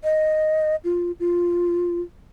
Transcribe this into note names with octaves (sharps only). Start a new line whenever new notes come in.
D#5
F4
F4